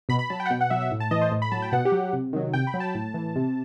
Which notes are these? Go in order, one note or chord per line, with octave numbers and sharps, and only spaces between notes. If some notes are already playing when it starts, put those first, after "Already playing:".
B2 B5
B5
F#3 A5
G5
F#5
B2 G5
F#5
F#3 E5
E5
A2
A5
E3 D#5
C5
A2
B5
F#3 A5
G5
B2 F#5
G4
F#3
C3
D#3 F#3
C3 G5
B5
F#3
A5
A2
E3
C3